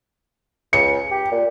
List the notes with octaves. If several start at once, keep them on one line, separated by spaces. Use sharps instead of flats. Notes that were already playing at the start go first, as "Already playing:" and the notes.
C#2 C#7
G4
A#2